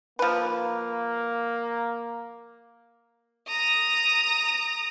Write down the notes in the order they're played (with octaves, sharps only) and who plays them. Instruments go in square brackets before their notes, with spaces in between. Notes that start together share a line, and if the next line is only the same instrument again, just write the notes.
[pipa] F3 B4 [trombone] A#3
[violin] A#5 D#6